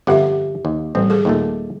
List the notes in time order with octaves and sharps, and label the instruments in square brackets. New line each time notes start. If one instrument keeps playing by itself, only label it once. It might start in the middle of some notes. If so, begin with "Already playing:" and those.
[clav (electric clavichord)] G1 F2 F#5 [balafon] G4 E5
[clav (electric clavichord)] D#2
[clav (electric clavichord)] A1 C4 [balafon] G3
[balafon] G#4 A4
[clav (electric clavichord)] D#2 A#2 A3